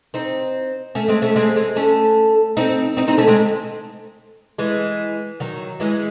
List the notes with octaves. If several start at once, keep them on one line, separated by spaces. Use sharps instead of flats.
C4 D#4
A3 C#4
G#3 C4
A3 C#4
G#3 C4
G#3 C4
A3 C#4
C4 D#4
C4 D#4
C4 D#4
A3 C#4
G#3 C4
E3 G#3
D#3 F#3
E3 G#3